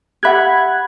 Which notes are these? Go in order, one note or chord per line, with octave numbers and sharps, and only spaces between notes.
G4 E5 F#5 B5 F#6 G#6